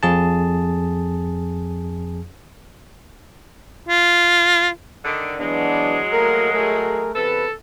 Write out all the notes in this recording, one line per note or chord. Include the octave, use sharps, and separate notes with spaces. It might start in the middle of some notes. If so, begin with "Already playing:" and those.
F2 G#4 A5
F4
D3 D#3
E3 F#3 G#3 B3 D4
A3 A#3 A#4
A3 G#4 A#4
E2 C3 A4 B4